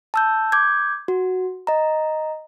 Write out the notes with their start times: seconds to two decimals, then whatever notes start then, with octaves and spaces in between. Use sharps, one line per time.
0.14 A5 E6 G6
0.52 D6 G6 G#6
1.08 F#4
1.67 D#5 A#5